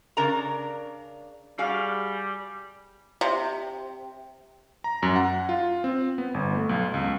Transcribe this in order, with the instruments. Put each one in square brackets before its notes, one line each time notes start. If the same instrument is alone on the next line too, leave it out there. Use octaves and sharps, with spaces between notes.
[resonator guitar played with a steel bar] C#3 D4 A#4 D5 A#5
[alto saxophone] G3 [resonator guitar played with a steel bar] F#4 G#4 F5
[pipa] C3
[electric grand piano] A#5
F#2
F#5
F4
C4
B3
G1
A3
B1
C#2